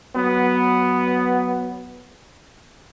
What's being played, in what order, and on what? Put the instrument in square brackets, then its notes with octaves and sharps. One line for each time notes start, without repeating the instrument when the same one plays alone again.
[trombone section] F#3 B3